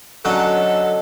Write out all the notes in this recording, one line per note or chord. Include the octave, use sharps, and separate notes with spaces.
D3 F#3 C#4 A4 D#5